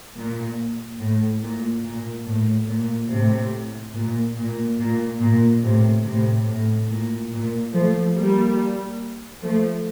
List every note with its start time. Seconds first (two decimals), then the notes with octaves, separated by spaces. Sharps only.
0.15 A#2
0.99 A2
1.41 A#2
1.84 A#2
2.26 A2
2.67 A#2
3.09 A2 C3
3.94 A#2
4.36 A#2
4.78 A#2
5.21 A#2
5.63 A2 C3
6.05 A2 C3
6.47 A2
6.89 A#2
7.31 A#2
7.73 F3 A3
8.16 G3 A#3
9.42 F3 A3